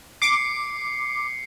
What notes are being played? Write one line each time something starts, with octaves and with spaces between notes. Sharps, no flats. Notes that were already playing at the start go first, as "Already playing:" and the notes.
D6 C7 C#7